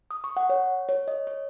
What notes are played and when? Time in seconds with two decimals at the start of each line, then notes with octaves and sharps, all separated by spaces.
0.11 D#6
0.24 C#6
0.37 F#5
0.50 C#5
0.89 C#5
1.08 D#5
1.27 C#5